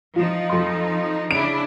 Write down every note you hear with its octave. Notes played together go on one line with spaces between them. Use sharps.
F3 D#4 F4
F2 C6
C#3 D4 E4 D7